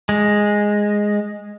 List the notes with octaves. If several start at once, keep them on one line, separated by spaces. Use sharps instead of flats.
G#3